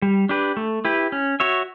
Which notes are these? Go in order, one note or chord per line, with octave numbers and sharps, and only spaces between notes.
G3
D4 G4 B4
A3
E4 G4 B4
C#4
F#4 C#5 E5